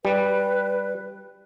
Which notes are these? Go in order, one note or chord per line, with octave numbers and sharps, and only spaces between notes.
G3 B4